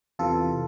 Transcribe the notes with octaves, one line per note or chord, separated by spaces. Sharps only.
E2 C3 E3 F4 A4